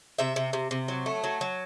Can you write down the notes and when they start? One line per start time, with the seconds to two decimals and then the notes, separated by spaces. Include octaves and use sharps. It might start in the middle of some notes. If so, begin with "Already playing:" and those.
0.18 C3 E5
0.36 C3
0.53 C3
0.71 C3
0.88 F#3
1.06 A3
1.24 F#3
1.41 F#3